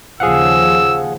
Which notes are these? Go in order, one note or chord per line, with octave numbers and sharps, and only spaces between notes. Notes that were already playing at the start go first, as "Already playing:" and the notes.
D#2 C#3 F3 G#4 F5 F#5 E6